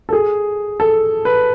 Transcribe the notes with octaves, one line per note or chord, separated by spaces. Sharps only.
A4
G#4
A4
B4